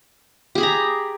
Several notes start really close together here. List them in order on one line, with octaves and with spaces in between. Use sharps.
G4 G#4 B5 A#5